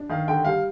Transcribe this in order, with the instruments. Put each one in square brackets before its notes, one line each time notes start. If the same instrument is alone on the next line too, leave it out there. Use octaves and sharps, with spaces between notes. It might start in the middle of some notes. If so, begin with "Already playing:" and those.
Already playing: [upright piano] D4
D#3 F5
D3 G5
G3 F5